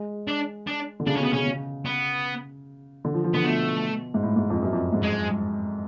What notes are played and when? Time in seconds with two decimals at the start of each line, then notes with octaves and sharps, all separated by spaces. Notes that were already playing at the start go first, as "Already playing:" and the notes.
Already playing: G#3
0.27 D4
0.67 D4
1.00 D3
1.06 C#3 D4
1.16 C#4
1.19 B2 B3
1.33 C#3 C#4
1.46 C#3
1.86 B3
3.04 D3
3.14 F3
3.24 F3
3.34 D3 B3
3.44 B2 A3
4.14 G#2
4.23 A2
4.36 G#2
4.50 F2
4.62 F#2
4.72 F2
4.92 G#2
5.03 G#3